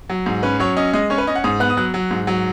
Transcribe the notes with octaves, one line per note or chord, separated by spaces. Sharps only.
F#3
G#2
C#4 B4
F#3 C#5
C#4 D#5
G#3 D#5
C#4 C#5
B4
C#4 D#5
F#5
G#2 D#6
B3 F#6
D#6
F#3 F#6
F#3
G#2
F#3